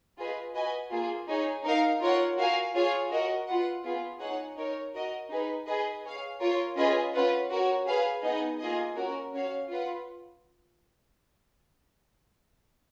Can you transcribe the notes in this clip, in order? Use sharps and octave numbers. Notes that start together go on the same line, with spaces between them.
F4 G#4 B4 D#5
F#4 B4 D#5 G#5
A#3 F4 G#4
D#4 G#4 C#5
D#4 A#4 F5
F4 A#4 C#5 F#5
F#4 A#4 F5 G#5
F4 G#4 C#5 F5
F#4 A#4 D#5 F#5
F4 B4 F#5
B3 F4 G#4
D#4 G#4 C#5 F#5
D#4 A#4 C#5
F#4 A#4 D#5
D#4 G#4 B4
G#4 B4 D#5
G#4 C#5 F5
F4 A#4 C#5
C#4 F4 G#4 B4 D#5
C#4 F4 B4 F#5
F#4 A#4 C#5
G#4 B4 F5
B3 D#4 G#4 D#5
A#3 F4 G#4 D#5
C#4 F#4 A#4
C#4 F#4 C#5 F5
F4 B4 F#5